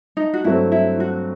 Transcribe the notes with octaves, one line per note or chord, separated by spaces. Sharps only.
D#4
F#4
G2 F#3 A3 C4 E4
E4
F#4